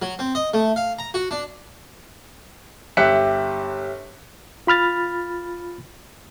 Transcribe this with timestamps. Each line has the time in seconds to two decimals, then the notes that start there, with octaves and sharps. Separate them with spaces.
0.02 F#3
0.19 C4
0.35 D#5
0.54 A3
0.76 F5
0.99 A#5
1.14 F#4
1.31 D4
2.97 G1 G4 E5 F#6 B6 C#7
4.67 F4 B5 F6 A6